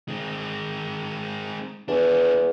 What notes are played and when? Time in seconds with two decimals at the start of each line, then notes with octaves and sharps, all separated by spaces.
0.08 G#3 C4
1.88 E2 B3 D4